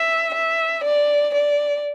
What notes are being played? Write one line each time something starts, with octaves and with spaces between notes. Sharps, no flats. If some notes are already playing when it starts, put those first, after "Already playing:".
Already playing: E5
E5
D5
D5